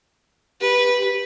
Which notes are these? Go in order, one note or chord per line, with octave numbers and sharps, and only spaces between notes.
G4 B4